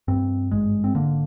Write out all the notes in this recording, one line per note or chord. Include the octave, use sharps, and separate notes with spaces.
G2 C4
G#1 G#3
C4
D3 A#3